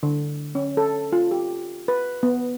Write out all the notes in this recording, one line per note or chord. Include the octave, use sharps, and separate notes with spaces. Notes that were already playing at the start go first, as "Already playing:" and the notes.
D3
C#4
A4
F4
G4
B4
B3